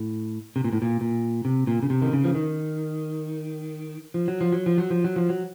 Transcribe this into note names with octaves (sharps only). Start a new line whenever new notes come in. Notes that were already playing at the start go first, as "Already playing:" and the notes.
Already playing: A2
C3
A#2
A2
A#2
A#2
C3
A#2
C#3
C3
D#3
C#3
F3
D#3
F3
F#3
F3
F#3
F3
F#3
F3
F#3
F3
F#3